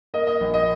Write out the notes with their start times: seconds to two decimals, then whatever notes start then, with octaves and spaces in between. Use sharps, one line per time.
0.14 A#3 D#5
0.27 D#5
0.41 A#1
0.54 D#5